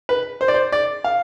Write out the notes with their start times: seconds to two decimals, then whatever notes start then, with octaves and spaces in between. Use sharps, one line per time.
0.09 B4
0.41 C5
0.48 D5
0.54 C5
0.72 D5
1.04 F5